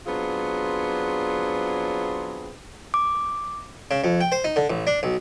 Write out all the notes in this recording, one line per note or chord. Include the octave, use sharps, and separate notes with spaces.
F#3 B3 C4 D4 F4 G#4
D6
C#3
F2
G5
C5
D#4
D3
A1
D4
B1